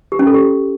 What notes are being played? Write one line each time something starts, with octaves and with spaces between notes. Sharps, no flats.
G4
C#4
A4
G4